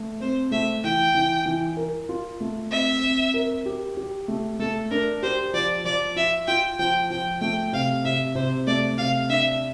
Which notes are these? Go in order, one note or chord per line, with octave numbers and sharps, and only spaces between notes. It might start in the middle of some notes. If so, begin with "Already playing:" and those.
Already playing: A3
C4 C5
A3 E5
E3 G5
E3
E3
A#4
F4
A3
C4 E5
C4
A#4
G4
G4
A3
A3 A4
D4 A#4
G4 C5
F3 D5
F3 D5
F4 E5
F4 G5
F3 G5
F3 G5
A3 G5
C3 F5
C3 E5
C3 C5
A3 D5
C3 F5
D4 E5